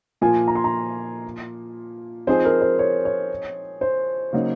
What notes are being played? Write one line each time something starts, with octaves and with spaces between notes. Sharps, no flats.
A#2 F3 A#3 F4 G#5
A#5
C6
A#5
F3 C4 D#4 G#4 C5
A#4
C5
C#5
C#5
C5
C#3 F#3 A#3 D#4 F#4